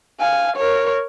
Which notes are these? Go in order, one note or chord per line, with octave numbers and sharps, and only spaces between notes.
F5 G#5
A#4 C#5